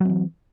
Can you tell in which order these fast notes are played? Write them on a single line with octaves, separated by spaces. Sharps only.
F#3 C4 E3